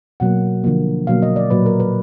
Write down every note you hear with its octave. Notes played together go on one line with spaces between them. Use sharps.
B2 F#3 A#3 F#5
D3 F3 A#3
B2 F#3 A#3 F5
D#5
D5
A#2 F#3 A#3 B4
A#4
B4